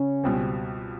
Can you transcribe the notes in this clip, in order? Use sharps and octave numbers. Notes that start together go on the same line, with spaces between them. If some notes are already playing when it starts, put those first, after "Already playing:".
Already playing: C#3 C#4
C#2 B2 G3 C4